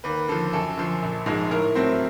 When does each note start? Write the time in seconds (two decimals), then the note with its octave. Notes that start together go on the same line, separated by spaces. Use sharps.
0.04 D#2 B4
0.28 D3 F3 A4
0.53 F#2 A4
0.77 D3 F3
1.02 A#1
1.26 G#2 F3 G#3
1.51 A2 A#4
1.75 F#3 A3 C4